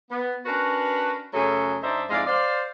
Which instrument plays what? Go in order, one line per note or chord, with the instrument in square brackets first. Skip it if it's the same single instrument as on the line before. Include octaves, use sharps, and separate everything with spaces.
[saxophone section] B3
C#4 D4 F#4 A#4 B4
F#2 C#3 F#3 A3 G#4 A4
F#2 D4 D#4 C5 D5 E5
F2 G#2 G#3 E4 D5 F5
C5 D5 F5